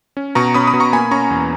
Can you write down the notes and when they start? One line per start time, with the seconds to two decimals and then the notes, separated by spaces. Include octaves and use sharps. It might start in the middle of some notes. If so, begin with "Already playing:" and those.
0.17 C#4
0.35 B2 A#5 C#6
0.54 C#4 B5 D#6
0.67 B5 D#6
0.73 B2
0.80 A#5 C#6
0.93 A#3 G#5 B5
1.11 C#4 A#5 C#6
1.30 E2